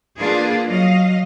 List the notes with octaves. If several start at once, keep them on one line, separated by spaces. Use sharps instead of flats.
A#3 D4 F4 G#4 B4
F#3 D#5 F5